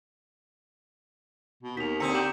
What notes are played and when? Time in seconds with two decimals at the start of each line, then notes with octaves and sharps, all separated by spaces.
1.63 B2
1.77 D#2 D#4 B6 F7
2.00 D3 C4 A#5 D#6 E6 C#7
2.14 G4 C5 A#5 E7 F#7